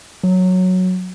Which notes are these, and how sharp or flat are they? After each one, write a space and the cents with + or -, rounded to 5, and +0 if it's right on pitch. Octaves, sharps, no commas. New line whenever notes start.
F#3 -5